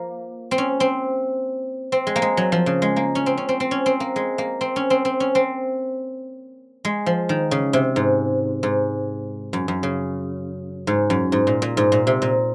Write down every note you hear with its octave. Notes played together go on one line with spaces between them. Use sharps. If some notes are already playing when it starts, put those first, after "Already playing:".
Already playing: F3 A#3
C4
C#4
C4
C4
G#3
A#3
G#3
F#3
F3
C#3
G#3
A#3
C#4
C4
C#4
C4
C4
C#4
C4
A#3
G#3
A#3
C4
C#4
C4
C4
C#4
C4
G#3
F3
D#3
C#3
C3
G#2
G#2
F#2
F#2
C#3
G#2
F#2
G#2
A#2
A#2
G#2
A#2
C3
A#2